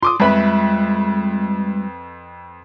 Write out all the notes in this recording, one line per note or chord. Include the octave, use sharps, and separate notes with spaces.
F4 C6 D6 D#6
F2 G3 G#3 F4 B4 E5 B5